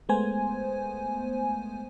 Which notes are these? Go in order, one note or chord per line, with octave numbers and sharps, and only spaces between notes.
G#3 A3 B3 C5 G#5